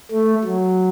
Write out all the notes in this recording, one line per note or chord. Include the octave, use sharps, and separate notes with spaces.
A3
F#3